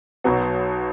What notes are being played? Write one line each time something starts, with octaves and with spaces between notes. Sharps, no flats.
B1 B2 F#3 B3